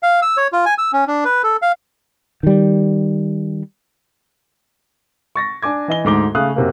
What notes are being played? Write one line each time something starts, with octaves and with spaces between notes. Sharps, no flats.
F5
E6
C#5
F4
G#5
E6
C#4
D4
B4
A4
F5
D#3 G3
C#6 A6 A#6
D4 G#5 D6 G#6
E3 D#5 G7
D2 G#2 D6 G7
C#3 A3 F5 D#6 F#6
F#2 C3 A#3